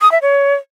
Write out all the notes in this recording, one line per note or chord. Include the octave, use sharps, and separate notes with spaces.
D#6
E5
C#5